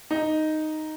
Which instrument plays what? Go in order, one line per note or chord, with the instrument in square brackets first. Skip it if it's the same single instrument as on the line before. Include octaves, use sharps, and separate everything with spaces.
[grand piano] D#4